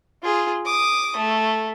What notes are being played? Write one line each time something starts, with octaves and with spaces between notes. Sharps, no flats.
F4 G#4
D6 D#6
A3